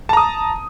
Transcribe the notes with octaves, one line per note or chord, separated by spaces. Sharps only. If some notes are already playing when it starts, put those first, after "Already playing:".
A5 A#5 D#6